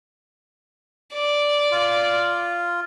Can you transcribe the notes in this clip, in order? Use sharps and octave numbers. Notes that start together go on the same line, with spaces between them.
D5
F4